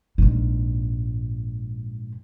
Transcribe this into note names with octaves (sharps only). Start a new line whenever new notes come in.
A#1 G#2